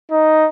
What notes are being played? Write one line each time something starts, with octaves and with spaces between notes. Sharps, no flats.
D#4